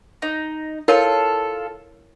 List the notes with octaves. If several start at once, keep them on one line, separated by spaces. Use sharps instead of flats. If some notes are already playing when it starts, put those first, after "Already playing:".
D#4
E4 F4 A4 A#4 C#5